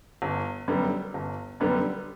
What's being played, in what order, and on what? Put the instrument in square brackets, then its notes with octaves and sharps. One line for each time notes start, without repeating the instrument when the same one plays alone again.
[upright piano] G1
F#2 D3 G3 B3
G1
F#2 D3 G3 B3